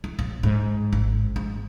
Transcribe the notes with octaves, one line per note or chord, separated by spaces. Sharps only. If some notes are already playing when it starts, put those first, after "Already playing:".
E4
A#1
G#2
G#1
G#2